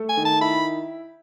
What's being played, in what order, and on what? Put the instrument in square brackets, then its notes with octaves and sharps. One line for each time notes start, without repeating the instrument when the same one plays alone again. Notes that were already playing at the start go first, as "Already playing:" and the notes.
Already playing: [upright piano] A3 A4
[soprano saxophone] G#5
[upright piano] D#3
[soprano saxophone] A5
[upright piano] E4 [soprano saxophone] B5